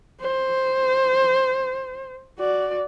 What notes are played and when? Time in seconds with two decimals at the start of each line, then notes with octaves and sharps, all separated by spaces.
0.21 C5
2.39 F#4 D5